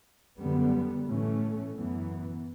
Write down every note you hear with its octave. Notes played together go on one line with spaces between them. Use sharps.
F#2 D3 G3 B3
A2 E3 A3 C#4
F#2 E3 B3